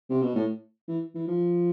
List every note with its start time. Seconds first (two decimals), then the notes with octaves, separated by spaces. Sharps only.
0.10 C3
0.22 B2
0.36 A2
0.88 E3
1.15 E3
1.28 F3